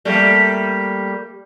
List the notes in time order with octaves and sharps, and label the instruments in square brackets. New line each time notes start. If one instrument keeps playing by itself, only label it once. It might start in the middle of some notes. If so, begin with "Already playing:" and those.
[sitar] G3 A3 A#3